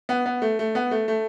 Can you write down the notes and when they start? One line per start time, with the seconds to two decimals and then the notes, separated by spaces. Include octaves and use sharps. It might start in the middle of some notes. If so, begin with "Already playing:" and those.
0.09 B3
0.26 B3
0.42 A3
0.59 A3
0.75 B3
0.91 A3
1.08 A3